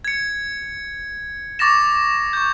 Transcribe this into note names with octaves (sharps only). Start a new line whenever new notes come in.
G#6 C#7
C#6 D6 A6 A#6 E7
C#6 G6